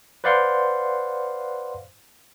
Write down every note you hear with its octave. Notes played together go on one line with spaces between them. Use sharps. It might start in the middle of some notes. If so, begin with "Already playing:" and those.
B4 C5 D5 F5 F#5 C6